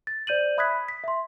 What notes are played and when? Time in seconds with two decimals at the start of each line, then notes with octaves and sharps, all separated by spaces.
0.07 A6
0.27 C5 D5 G6 D#7 F#7
0.57 E5 B5 D#6 F#6 G#6 B6
0.89 B6
1.04 E5 C6